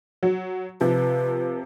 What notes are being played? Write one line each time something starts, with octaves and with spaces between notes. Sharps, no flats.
F#3
C3 F3 B4